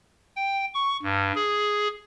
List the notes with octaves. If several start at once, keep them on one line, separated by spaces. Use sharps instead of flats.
G5
C#6
G2
G#4